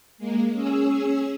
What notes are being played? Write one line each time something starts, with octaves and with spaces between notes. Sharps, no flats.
G#3 A#3
C#4 G#4 E6